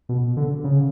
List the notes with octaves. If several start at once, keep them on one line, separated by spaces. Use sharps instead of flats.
B2
D3
C#3